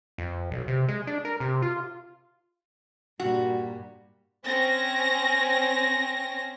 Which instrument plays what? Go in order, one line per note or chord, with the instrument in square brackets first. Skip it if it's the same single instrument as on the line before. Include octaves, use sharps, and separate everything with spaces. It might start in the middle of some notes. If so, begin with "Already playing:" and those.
[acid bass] F2
B1
C3
G#3
D4
A#4
C3
F4
[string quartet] G2 A#2 G3 [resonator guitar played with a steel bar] F#4
[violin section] C4 C#4 A#6